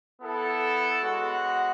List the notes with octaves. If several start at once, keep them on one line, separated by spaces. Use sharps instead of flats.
B3 E4 A4
G#3 B3 F#4 C#5 F#5